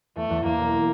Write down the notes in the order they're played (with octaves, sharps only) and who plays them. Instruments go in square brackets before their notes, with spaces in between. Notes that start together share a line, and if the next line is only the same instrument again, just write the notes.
[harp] E2 [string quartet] A3
[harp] E2
[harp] E2 [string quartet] A#3
[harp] E1